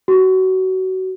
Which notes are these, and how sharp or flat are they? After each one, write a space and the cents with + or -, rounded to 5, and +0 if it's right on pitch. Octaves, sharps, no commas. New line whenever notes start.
F#4 +25